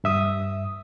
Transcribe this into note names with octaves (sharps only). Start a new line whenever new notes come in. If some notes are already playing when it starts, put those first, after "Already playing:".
G2 E5 D#6